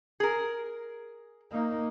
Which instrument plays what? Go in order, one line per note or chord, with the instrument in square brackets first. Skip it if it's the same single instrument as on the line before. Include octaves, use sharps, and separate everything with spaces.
[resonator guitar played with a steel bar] G#4 A#4
[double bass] A#3 D#4